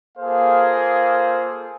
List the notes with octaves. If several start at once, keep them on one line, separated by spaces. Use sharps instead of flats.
A#3 F4 G#4 A4 C5 F5